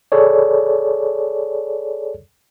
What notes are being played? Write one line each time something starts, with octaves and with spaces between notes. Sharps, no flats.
G#4 A4 C#5 D5